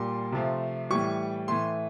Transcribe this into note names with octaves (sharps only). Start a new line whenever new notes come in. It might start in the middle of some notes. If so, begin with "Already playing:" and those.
Already playing: A#2 G3 C6
C3 F3 A3
A2 E3 G3 C#6
A2 E3 A3 C6